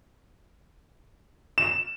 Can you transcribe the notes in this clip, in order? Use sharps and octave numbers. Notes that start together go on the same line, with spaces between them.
E7